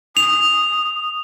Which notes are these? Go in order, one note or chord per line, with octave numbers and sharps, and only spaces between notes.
D#6 F7